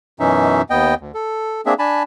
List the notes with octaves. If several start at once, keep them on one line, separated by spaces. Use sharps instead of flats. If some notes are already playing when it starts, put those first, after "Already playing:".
F#2 B2 E3 C#4 D#4 E5
D#2 B3 D#5 G5
D2
A4
A#3 C4 D4 G#4 E5
D4 G#5 A5 B5